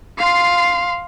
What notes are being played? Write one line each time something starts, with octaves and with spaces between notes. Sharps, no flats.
F5 C6